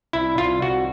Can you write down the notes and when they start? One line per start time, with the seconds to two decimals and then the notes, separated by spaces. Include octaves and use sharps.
0.13 C2 E4
0.38 C2 F4
0.62 C2 F#4